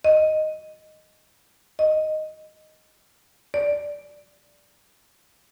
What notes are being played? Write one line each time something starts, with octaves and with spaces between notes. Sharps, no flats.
D#5
D#5
D5